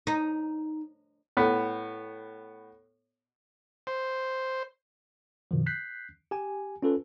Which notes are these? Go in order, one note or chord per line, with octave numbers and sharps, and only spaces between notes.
D#4
A2 B3
C5
F#2 B2 D#3 F3
F#6 G6 B6 C7
G4 G#5
C#4 F4 A4 B4